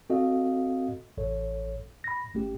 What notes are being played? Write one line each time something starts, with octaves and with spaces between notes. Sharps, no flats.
C4 F#4 A4 D#5 F5
A1 A4 C#5
B5 A#6
G#1 A3 C#4 G4